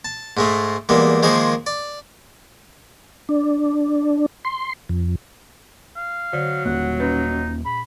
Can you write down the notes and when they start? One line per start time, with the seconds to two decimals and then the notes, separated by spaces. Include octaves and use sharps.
0.05 A5
0.37 G#2 G#3 A3
0.89 E2 G3 G#3 A#3
1.23 D#3 F3 G#3 A#3 G#4 C5
1.66 D5
3.29 D4
4.45 C6
4.89 F2
5.96 F5
6.33 D3 F#3 C5 D5
6.65 D#1 A#3 F#5
7.00 C#4 D#4 B4
7.65 A#2 B5